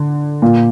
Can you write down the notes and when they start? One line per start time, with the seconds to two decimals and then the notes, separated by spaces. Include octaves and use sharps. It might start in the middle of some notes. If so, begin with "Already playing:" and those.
Already playing: D3
0.42 A#2